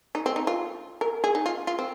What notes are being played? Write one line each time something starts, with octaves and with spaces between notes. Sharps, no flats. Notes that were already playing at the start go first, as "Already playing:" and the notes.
D#4
C4
D#4
F4
A#4
G#4
D#4
F4
F4
C4